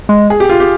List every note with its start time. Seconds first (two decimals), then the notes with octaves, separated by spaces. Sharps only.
0.09 G#3
0.30 G#4
0.40 G4
0.49 F4
0.60 G4